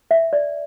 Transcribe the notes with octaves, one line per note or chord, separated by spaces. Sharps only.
E5
D5